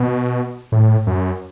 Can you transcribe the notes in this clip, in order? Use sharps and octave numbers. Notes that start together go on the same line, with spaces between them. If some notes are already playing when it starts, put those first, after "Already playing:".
Already playing: B2
A2
F#2